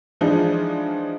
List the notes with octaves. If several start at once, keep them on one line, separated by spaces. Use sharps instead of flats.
E3 F3 G#3 D4 D#4 F4